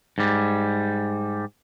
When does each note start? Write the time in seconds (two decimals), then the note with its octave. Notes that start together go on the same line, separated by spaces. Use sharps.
0.18 G#2 G3